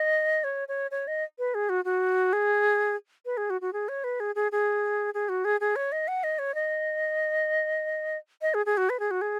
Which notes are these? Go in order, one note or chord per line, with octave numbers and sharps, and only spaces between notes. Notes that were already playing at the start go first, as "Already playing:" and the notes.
Already playing: D#5
C#5
C#5
C#5
D#5
B4
G#4
F#4
F#4
G#4
B4
G#4
F#4
F#4
G#4
C#5
B4
G#4
G#4
G#4
G#4
F#4
G#4
G#4
C#5
D#5
F#5
D#5
C#5
D#5
D#5
G#4
G#4
F#4
B4
G#4
F#4
G#4